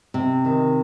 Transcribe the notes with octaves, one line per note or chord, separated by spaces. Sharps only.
C3
D#3